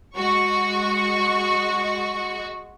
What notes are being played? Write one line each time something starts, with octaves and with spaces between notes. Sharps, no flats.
G#3 F#4 C#6